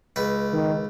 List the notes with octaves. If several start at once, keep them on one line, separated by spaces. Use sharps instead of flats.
C#2 B4
D#3